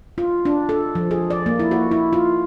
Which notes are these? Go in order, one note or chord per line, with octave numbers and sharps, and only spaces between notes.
F4
D4
A4
F3
G#4
D5
A#3
E4
F#4
E4
F4